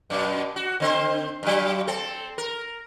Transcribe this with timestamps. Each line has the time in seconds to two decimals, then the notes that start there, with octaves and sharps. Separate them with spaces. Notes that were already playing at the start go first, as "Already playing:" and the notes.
0.10 F#2 B2
0.56 F#4
0.80 D3 C4 C5
1.43 G2 F#3
1.87 C4 A4
2.38 A#4